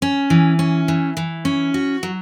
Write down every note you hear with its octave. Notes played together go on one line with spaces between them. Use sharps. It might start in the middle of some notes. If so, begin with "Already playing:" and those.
C#4
E3
C#4
E3
E3
C#4
F#4
F#3